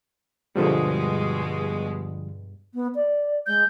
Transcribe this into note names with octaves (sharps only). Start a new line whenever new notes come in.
G2 B2 D3 F3 G3 G#3
B3
D5
G#3 G6